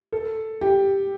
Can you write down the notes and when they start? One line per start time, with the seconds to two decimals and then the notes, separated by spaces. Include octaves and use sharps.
0.12 A4
0.61 G4